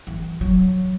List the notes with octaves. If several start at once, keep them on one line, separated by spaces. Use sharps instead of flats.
E3
F#3